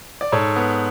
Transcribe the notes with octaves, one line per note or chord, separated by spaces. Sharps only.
D5
G#2 A4 C#5
B3